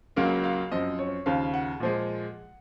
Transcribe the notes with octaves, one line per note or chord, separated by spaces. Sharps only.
C#2 C#3 F#3 A#3 F5
F5
F#2 F3 C4 D#5
C#5
D#2 C#3 F3 F5
F#5
A#2 F3 G#3